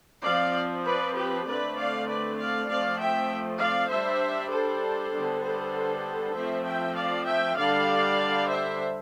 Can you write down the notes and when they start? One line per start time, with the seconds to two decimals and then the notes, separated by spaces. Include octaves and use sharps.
0.24 F3 C4 D5 F5
0.85 B4 D5
1.15 G4 B4
1.46 D3 A3 C4 B4 D5
1.76 D5 F5
2.08 B4 D5
2.38 D5 F5
2.68 F3 A3 C4 D5 F5
2.99 E5 G5
3.60 D5 F5
3.90 G3 D4 C5 E5
4.52 A4 C5
5.13 D3 G3 B3 D4
5.44 A4 C5
6.35 F3 A3 C4 C5 E5
6.66 E5 G5
6.97 D5 F5
7.28 E5 G5
7.58 D3 G3 D4 D5 F5
8.50 C5 E5